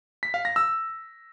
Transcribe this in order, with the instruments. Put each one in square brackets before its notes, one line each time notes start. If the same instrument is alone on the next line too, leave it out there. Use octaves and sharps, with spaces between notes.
[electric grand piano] B6
F5
A#6
E6